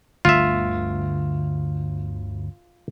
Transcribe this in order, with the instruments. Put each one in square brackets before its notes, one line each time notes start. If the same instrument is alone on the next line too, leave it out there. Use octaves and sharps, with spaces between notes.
[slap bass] G1 D2 [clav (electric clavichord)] F4 E5